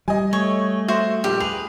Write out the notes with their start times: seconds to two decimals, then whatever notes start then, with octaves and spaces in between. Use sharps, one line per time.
0.08 G3 D#5 G#5
0.33 A3 C#5
0.88 F#4 C5 E5
1.24 A#1 G4
1.40 G#4 B4 F7